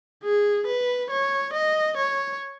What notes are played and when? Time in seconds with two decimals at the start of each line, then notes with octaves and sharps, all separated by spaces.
0.24 G#4
0.67 B4
1.11 C#5
1.53 D#5
1.97 C#5